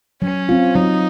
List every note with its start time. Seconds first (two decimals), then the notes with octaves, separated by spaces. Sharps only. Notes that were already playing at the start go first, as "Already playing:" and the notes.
0.22 F#3 C#4
0.49 C4 F4
0.75 F#3 D#4